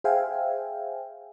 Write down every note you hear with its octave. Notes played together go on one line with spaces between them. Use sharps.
G#4 C5 E5 F5 G5 G#5